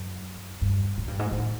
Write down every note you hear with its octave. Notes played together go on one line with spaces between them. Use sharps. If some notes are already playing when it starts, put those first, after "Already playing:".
Already playing: F#2
G2
G#2
G2
G#2
A2